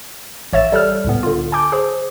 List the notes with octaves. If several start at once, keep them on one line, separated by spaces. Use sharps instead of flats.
A1 C#5 E5 A6 E7
G3 A4 E6 F6
C#2 A2 B3
D3 F4
G#5 A5 D6 G6
G#4 C5